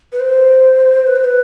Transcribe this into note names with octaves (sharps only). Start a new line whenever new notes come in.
B4
C5
B4
C5
B4